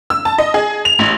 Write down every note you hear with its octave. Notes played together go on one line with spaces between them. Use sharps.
E6
A5
D#5
G#4
F7
A1